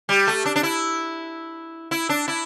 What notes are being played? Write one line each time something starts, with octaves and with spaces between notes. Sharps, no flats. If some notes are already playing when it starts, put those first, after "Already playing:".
G3
A3
D4
D4
E4
E4
D4
E4